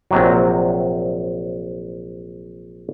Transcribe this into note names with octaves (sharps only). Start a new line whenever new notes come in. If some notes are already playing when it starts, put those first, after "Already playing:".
A#1 C3 F#3